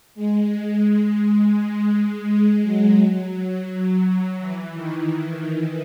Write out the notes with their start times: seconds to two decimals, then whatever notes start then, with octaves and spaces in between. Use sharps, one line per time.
0.15 G#3
0.51 G#3
0.86 G#3
1.21 G#3
1.57 G#3
2.28 G#3
2.63 F#3
4.40 E3
4.75 D#3